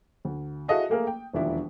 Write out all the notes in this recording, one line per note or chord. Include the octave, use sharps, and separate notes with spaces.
D2
E4 F#4 G#4 A4 D#5 F5
A3 A#3 G#4 A#4
G5
E1 D#2 F3 D4 E4